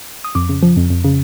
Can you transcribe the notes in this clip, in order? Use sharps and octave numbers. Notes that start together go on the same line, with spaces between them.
D#6
F2 D6
C#3
F3
F2
F2
C#3